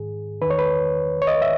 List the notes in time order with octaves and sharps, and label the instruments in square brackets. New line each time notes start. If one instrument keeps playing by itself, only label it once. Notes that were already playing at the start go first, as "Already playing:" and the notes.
Already playing: [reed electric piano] G#2 D#3 G#4
D#3 B4
E2
C#5
B4
C#5
D#5
E5